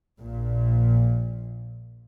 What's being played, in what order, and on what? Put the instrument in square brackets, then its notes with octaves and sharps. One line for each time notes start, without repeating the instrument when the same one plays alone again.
[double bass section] A#1 A#2